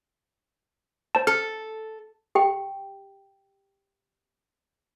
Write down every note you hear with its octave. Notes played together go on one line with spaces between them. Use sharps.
C5 A5
A4 F6
G4 G5